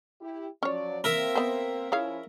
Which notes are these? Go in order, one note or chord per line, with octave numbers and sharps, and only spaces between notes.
E4 G4
F3 F#3 C#4 C#5 D5
A#3 C4 A#4 E5
B3 C5
F3 C#4 E4 G#4 C#5 F5